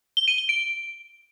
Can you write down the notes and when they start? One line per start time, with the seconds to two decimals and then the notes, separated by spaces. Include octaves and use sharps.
0.17 G7
0.28 D#7
0.38 G7
0.49 D7